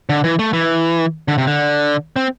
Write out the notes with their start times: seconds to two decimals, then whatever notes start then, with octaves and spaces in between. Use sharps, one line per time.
0.09 D3
0.24 E3
0.39 A3
0.53 E3
1.28 D3
1.38 C3
1.47 D3
2.16 C4